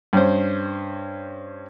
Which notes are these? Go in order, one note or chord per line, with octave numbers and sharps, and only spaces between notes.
G2 C#4 C5